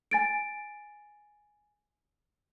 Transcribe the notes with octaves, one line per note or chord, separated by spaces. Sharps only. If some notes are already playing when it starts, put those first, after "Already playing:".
G#5 A6 D7